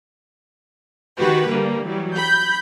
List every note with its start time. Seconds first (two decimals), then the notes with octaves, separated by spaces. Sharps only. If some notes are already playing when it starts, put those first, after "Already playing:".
1.18 D#3 F#4 G4 B4
1.49 D3 G3 A#3
1.86 E3 F#3 G3
2.16 B5 G6